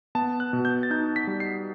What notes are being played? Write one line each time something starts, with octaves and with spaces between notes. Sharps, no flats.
B3 A5
F#6
B2
G6
A6
D#4 G6
B6
G3
C7